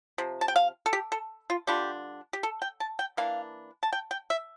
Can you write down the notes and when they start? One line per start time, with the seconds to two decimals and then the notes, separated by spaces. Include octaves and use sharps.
0.18 C3 F3
0.41 A5
0.48 G5
0.56 F5
0.86 A4
0.93 G4
1.12 A4
1.50 F4
1.67 D3 G3 D4 F4 G4
2.33 G4
2.43 A4
2.62 G5
2.80 A5
2.99 G5
3.17 E3 A#3 D4 F5
3.83 A5
3.93 G5
4.11 G5
4.30 E5